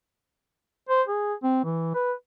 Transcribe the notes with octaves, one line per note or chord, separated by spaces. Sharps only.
C5
G#4
C4
E3
B4